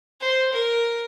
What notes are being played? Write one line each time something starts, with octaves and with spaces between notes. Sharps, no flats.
C5
A#4